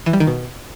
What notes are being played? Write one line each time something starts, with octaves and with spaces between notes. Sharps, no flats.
E3
G3
D#3
B2